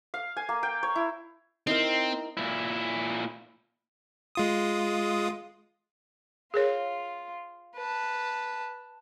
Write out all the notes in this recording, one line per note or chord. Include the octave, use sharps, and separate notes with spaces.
F5
G#5
A#3
G5
C#5
E4
C4 D#4 E4 A#4
A#2 E4
G#3 F4 D#6
F4 G#4 A#4 C#5
B4 A5